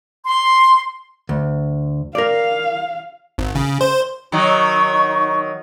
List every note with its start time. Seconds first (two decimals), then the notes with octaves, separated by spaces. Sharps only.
0.25 C6
1.29 D2
2.15 A#4 D5 F5
3.38 G#1
3.55 C#3
3.81 C5
4.32 D#3 F#3 D#4 C#6